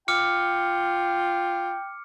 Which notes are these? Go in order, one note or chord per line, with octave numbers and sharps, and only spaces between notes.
F4 G5 D6 F6 C#7